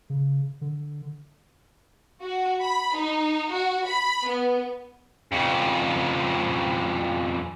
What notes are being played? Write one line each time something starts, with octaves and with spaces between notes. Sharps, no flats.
C#3
D3
F#4
B5
D#4
F#4
B5
B3
F2 C#3